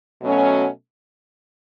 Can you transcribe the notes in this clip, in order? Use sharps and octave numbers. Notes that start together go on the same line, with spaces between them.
B2 F#3 A3 C#4